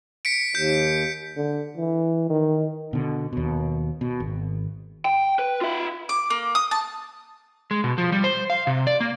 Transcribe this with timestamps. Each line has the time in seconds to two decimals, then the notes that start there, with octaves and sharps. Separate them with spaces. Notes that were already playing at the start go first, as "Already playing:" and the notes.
0.25 B6 C#7 D7
0.55 D#2 G6
1.37 D3
1.77 E3
2.29 D#3
2.93 B2 D3
3.33 D#2 B2
4.01 B2
4.20 G#1
5.05 G5
5.39 B4
5.61 F4 E5
6.09 D6
6.30 A#3
6.55 D#6
6.71 A5
7.71 G#3
7.84 B2
7.98 F3
8.12 G3
8.24 C5
8.50 F5
8.67 C3
8.87 D5
9.01 A#3